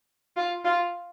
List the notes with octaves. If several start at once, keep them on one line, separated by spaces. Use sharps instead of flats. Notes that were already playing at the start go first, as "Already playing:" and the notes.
F4
F4